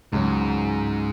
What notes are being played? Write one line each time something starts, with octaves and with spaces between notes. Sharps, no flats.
C#2 G#2 C#3 F#3